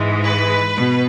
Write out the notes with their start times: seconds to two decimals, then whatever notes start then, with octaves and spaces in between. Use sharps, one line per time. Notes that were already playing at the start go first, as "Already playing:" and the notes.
Already playing: G#2 E3 G#3
0.24 B4
0.78 B2